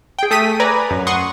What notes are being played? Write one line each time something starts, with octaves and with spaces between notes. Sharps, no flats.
G#4 G5
A3 D#6 B6 D#7
B4 D5 G#5 A#5
F#2
F#5 C6 C#6 D#6